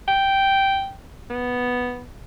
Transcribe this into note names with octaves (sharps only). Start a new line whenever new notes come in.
G5
B3